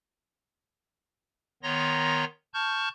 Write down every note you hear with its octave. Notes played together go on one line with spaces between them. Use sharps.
D#3 B3 C#5 A#5 C6 A#6
A5 C#6 F6 G6